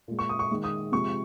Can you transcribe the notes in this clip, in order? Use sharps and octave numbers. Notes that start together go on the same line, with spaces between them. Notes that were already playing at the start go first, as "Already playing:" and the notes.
A#2 G#3
C#6
D#6
C#6
D#3 G#3
D#6
C3 F3 G#3 C#6